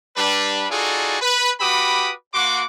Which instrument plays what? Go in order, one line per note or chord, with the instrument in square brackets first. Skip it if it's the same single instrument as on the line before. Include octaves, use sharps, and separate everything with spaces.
[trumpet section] G3 D4 B4
D#4 F4 F#4 G#4 A4 D5
B4
F#4 G4 B4 B5 D6 D#6
A#3 F#4 F#5 C6 D6